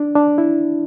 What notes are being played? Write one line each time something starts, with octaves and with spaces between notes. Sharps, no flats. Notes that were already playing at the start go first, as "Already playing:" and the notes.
Already playing: D4
D4
E4